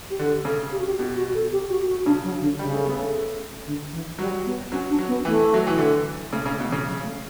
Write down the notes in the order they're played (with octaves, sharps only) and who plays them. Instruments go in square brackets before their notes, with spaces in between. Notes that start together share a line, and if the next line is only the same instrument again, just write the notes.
[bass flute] G4
[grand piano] D3
[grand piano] C#3 [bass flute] A4
[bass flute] G4
F#4
G4
[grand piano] B2 [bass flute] G4
[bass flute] F#4
A4
G4
F#4
F#4
[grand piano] C#3 [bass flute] D4
[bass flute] F#3
D3
[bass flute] C#3 [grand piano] G3
[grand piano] A3
B3
A3
[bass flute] D3
E3
[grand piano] F#3 [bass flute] G3
[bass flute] B3
[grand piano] F#3 [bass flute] C#4
[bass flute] D4
[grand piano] F#3
[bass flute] B3
[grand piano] E3 [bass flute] A3
[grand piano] F#3
E3
D3
[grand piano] C#3 [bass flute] A3
[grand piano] C#3
[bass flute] A3
[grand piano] B2
[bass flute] E3
[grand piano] C#3
[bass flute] F#3
A3